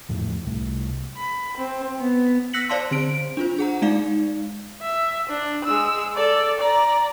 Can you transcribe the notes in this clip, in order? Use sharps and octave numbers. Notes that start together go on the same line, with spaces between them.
E2 A2 F3 A3
C2 C3 G3 A3
B5
C4
B3
E6 F#6 A#6 B6 C#7 F#7
C5 D5 F5 A5 C6
D3 C4 C5 D7
D4 F4 C5
G#4 F#5 A#5
G#3 D#4 D5 F5
E5
D4
G#3 E6
A4 D5
D5 A#5